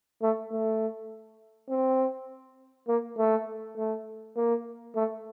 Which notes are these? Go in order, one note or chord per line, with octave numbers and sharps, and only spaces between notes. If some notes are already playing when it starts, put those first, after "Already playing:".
A3
A3
C4
A#3
A3
A3
A#3
A3